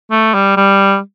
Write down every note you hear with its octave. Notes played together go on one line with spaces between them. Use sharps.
A3
G3
G3